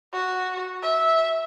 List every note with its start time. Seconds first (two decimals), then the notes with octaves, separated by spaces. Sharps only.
0.13 F#4
0.83 E5